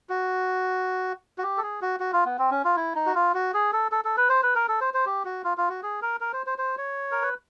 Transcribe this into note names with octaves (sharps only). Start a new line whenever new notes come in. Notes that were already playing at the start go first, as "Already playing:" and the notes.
F#4
F#4
G4
A4
G#4
F#4
F#4
F4
B3
C4
C#4
F4
E4
D#4
F#4
F4
F#4
G#4
A4
A4
A4
B4
C5
B4
A#4
A4
C5
C5
G4
F#4
F4
F4
F#4
G#4
A#4
A#4
C5
C5
C5
C#5
A#4
B4